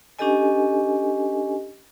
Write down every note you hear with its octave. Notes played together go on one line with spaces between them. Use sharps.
C#4 D4 G4 A4 D#5 G#5